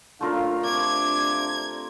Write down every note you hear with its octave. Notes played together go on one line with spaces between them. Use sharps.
F#2 A#2 A3 D4 F4 A#4 F5
C3 D4 D6 G#6